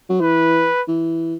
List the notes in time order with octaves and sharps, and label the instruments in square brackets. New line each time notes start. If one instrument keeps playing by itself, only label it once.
[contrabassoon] F#3
[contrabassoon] E3 [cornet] B4
[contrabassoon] E3